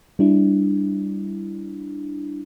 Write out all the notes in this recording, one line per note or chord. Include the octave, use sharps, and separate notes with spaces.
G3 D4 E4